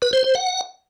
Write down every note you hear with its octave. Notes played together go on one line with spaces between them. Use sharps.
B4
C5
C5
F#5